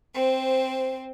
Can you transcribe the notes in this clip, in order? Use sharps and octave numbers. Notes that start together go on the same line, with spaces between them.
C4 C5